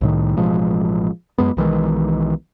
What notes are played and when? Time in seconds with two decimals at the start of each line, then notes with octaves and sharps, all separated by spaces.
0.01 C2 A2 D#3
0.36 A1 B2 F3 G#3
1.38 F#2 G#3 B3
1.57 B1 D#3 E3 G#3